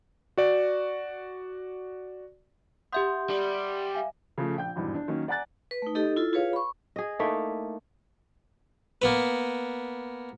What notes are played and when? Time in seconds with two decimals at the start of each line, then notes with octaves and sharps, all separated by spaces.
0.38 F#4 D5
2.92 G4 E5 F#5 C6 D#6 G6
3.30 G3
3.94 E5 F5 G#5
4.38 C#3 F3 A3
4.56 A#1 G5 G6
4.76 G#1 E2 G2 B2
4.94 D4
5.08 D#3 F#3 A#3 C#4
5.28 D5 F#5 G#5 A#5 F#6 A6
5.71 B4
5.82 A3 D#4
5.95 D#4 G4 A4 D#5
6.17 E4 F4 A4
6.33 F4 G#4 B4 C#5 F5
6.53 B5 C#6
6.96 G#4 D#5
7.19 A3 A#3 D#4 E4
9.02 A#3 B3 B4